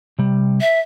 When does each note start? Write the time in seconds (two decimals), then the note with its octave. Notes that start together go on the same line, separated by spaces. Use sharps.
0.19 C3 G3
0.61 E5